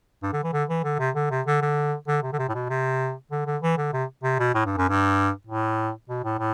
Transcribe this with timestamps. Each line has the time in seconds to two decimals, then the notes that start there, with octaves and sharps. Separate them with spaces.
0.23 G2
0.33 D3
0.44 E3
0.53 D3
0.69 E3
0.84 D3
0.99 C3
1.15 D3
1.30 C3
1.46 D3
1.61 D3
2.07 D3
2.23 C3
2.33 D3
2.38 C3
2.49 A2
2.54 B2
2.69 C3
3.31 D3
3.46 D3
3.62 E3
3.78 D3
3.93 C3
4.23 C3
4.39 B2
4.54 A2
4.66 G2
4.77 F#2
4.89 G2
5.47 A2
6.09 B2
6.24 A2
6.39 A2